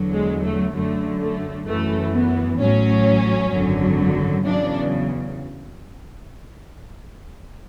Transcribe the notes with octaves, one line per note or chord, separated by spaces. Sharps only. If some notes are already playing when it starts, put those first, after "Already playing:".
Already playing: E2 D3 F#3
G#3
A3
F#2 D3 F#3 A3
A3
F#2 E3 A3
B3
A1 A2 F#3 C#4
G#1 F#2 D3 F#3
E2 C#3 F#3 D4